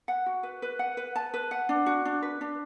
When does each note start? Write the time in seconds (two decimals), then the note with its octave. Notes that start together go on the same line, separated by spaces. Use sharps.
0.08 F#5
0.26 F#4
0.43 B4
0.62 B4
0.79 F#5
0.97 B4
1.16 A5
1.34 B4
1.51 F#5
1.69 D4
1.86 F#4
2.05 D4
2.22 B4
2.41 D4